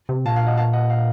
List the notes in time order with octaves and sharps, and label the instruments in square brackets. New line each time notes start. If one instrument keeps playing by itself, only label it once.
[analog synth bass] C3
[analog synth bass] A#2 [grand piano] F5 A5
[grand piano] F5
D#5 F#5
F5 A5
D#5 F#5
F5